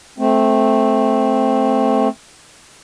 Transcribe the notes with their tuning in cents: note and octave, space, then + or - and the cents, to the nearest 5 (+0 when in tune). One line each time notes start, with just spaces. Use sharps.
A3 -10 C4 +0